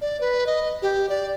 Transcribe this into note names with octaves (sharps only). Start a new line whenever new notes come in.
D5
B4
D#5
G4
D5